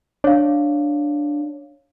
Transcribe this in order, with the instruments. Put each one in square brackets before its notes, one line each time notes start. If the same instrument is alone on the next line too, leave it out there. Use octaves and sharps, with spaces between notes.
[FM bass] D4 [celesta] C#5 F5